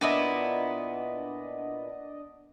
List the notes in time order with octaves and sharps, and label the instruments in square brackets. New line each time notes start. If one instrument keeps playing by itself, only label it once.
[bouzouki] A#2 B3 E4 [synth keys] D4 D5 D#5